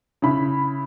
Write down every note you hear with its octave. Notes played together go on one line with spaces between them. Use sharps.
C#3 E4 B5